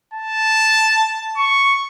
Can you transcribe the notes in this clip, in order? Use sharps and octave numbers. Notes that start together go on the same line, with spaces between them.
A5
C#6